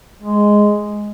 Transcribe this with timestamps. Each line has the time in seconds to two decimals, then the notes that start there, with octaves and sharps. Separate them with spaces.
0.22 G#3